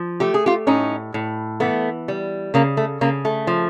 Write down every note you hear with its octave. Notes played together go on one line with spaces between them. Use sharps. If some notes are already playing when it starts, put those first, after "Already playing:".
Already playing: F3
A3 G4
G#4
F4 G4
A2 C#4 D#4
A2
E3 A3 B3
G3
C#3 A#3
A3
C#3 A#3
A3
F3